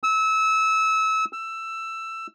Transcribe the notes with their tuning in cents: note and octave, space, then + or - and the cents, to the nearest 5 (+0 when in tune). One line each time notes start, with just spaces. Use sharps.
E6 -25
E6 +15